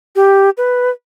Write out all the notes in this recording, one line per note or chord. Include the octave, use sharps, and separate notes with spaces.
G4
B4